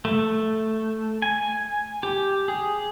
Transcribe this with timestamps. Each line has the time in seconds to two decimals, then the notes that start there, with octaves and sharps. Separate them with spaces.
0.05 A3
1.22 G#5
2.03 G4
2.48 G#4